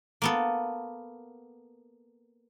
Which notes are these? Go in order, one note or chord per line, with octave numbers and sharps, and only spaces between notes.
A#3 B3 A4